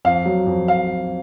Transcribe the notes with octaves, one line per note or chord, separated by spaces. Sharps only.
F2 F5
F#3
F2
F5